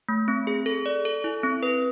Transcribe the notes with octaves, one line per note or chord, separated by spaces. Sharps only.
A3
C4
G#4
A4
D5
A4
E4
C4
B4